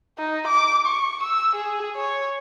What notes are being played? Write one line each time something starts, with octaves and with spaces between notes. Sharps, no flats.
D#4
D6
C#6
E6
G#4
C#5